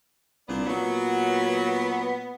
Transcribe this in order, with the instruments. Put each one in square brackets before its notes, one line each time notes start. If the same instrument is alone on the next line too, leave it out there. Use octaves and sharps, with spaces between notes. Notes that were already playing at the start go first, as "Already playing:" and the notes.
[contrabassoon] C2 [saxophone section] A#2 B3 D4
[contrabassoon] A#2 [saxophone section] F#3 [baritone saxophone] B3